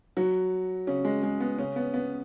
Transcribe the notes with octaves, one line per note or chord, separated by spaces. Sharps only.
F#3 F#4
C#3 C#4
G#3
G#3
B3
C#3 C#4
B3
B3